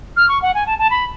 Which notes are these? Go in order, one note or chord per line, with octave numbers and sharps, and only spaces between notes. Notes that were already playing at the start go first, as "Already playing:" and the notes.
F6
C#6
F#5
G#5
A5
A5
B5